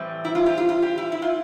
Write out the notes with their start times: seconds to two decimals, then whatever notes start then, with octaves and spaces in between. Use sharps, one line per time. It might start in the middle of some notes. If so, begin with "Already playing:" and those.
Already playing: A2 E3 G3 C4
0.25 E4
0.35 F4
0.46 G4
0.58 F4
0.69 F4
0.82 G4
0.98 E4
1.12 E4
1.22 F4